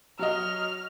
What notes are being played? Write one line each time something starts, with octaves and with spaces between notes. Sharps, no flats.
F#3 F#4 D#5 F6